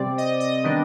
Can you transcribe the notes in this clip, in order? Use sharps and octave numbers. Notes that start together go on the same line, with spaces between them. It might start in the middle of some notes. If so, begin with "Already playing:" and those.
Already playing: C3 G3 C4 D5
D#5
D#5
D#3 G3 B3 D4